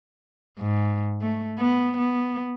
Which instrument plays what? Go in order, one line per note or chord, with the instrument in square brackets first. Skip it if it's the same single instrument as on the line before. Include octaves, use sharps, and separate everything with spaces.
[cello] G#2
A3
B3
B3